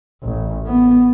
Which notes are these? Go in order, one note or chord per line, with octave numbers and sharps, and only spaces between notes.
A1
B3